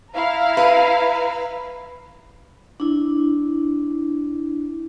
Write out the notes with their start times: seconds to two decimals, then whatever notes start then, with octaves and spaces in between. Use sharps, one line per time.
0.13 E4 F5 A#5
0.57 B4
2.80 D4 E4